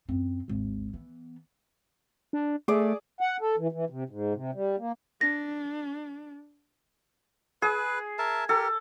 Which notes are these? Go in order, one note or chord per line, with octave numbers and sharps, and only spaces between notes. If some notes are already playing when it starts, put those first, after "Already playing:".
F#2 C4
G#1 D2
E3 B3
D4
A3 G#4 D5
F#5
A4
E3
E3
C3
G#2
C3
G3
A#3
D4 A#6
G#4 B4
A#4 E5 A5
G4 A4 A#4